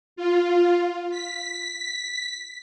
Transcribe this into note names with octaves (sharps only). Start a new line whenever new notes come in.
F4
B6